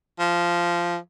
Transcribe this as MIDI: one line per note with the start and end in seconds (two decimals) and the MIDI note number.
0.19 0.97 53